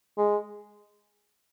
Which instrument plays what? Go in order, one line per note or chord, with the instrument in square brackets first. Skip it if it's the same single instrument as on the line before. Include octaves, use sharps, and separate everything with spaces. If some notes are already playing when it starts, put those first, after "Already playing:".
[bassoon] G#3